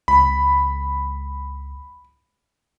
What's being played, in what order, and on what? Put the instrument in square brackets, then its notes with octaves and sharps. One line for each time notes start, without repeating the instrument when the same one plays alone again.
[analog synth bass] C#2 [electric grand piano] B5